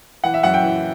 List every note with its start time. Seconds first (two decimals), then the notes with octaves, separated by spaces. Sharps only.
0.24 E3 F#5
0.34 E5
0.43 F#2 F#5
0.54 G5
0.63 E3